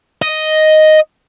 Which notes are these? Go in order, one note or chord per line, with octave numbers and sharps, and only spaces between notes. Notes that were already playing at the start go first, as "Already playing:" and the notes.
D#5